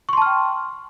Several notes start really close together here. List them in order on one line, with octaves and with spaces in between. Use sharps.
C#6 C6 A5 F6 G5